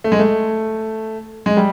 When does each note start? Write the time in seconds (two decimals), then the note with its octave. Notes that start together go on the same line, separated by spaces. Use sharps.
0.04 A3
0.12 G#3
0.19 A3
1.46 G#3
1.57 G3